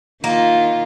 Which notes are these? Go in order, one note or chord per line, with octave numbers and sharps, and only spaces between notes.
D#3 A#3 F4